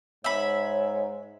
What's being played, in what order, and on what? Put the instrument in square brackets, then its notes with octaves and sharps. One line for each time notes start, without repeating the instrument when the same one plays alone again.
[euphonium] G#2 [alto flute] C#5 [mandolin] E5 B5